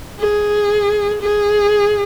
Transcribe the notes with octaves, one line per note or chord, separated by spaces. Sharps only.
G#4
G#4